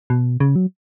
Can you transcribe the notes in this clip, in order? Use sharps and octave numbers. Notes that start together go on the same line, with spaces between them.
B2
C#3
F#3